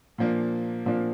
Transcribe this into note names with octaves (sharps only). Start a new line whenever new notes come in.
A#2 F3 A#3 D4
A#2 F3 A#3 D4